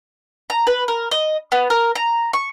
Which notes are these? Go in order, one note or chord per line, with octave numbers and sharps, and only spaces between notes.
A#5
B4
A#4
D#5
B3
A#4
A#5
C#6